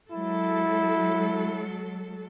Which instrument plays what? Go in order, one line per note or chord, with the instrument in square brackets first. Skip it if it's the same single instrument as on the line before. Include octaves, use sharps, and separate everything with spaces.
[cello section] F#3 G#3 A4 [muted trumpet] E4